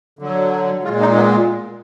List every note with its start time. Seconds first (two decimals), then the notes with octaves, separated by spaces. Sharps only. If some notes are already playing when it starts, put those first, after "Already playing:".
0.19 D3 F#3
0.83 G#3 F4
0.88 A#2
1.00 D#4
1.16 B3